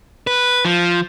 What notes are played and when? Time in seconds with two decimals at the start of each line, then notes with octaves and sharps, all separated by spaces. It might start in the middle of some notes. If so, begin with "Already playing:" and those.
0.27 B4
0.65 F3